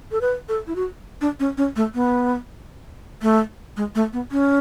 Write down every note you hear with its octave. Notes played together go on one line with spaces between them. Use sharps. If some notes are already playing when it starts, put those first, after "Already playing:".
A4
B4
A4
E4
F#4
D4
C#4
C#4
A3
B3
A3
G#3
A3
B3
C#4